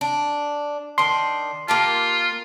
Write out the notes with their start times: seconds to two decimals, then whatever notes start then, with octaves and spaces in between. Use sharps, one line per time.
0.01 D4
0.98 D#3 D4 C6
1.68 A#3 F4 G4 A5